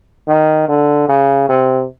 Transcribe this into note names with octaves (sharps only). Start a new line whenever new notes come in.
D#3
D3
C#3
C3